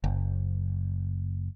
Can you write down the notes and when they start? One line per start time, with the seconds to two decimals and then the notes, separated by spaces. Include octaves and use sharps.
0.04 F#1